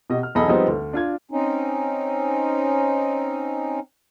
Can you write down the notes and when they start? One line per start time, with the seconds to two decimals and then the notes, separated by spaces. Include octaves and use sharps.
0.10 B2 G4 D#5
0.23 F6
0.35 B1 E2 G#4 A4 D#5 B5
0.48 F3 G3 G#3 B3 C4 D#4
0.68 D2
0.93 D4 F4 G#6
1.31 C4 C#4 D#4